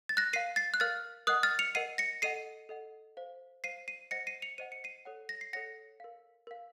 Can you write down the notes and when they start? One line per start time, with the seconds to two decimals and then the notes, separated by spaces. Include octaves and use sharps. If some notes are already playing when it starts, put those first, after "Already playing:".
0.09 A6
0.17 F#6 A#6
0.33 A#4 F5 C7 D#7
0.56 A6 C7
0.74 F#6
0.80 A#4 F5 F6 A6
1.27 A#4 D#5 F#5 D#6 F#6
1.43 F6 A6
1.59 C#7 F7
1.75 A#4 D#5 F#5 C7 D#7
1.98 A#6 C#7
2.22 A4 D#5 F#5 C7 D#7
2.69 A4 D#5 F#5
3.17 C5 F5
3.64 C5 F5 C7 D#7
3.88 C7 D#7
4.11 C5 D#5 F#5 A#6 C#7
4.27 C7 D#7
4.42 C#7 F7
4.58 C5 D#5 F#5 D#7
4.72 C#7
4.84 C7 D#7
5.05 A4 C#5 F#5
5.29 A#6
5.41 C7
5.53 A4 C#5 F#5 A#6 C#7
6.00 A#4 F5
6.47 A#4 F5